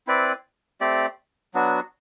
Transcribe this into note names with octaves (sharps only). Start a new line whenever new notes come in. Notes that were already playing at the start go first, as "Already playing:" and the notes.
C4 E4 B4 D5
A3 C4 G4 D5
F#3 B3 D4 F#4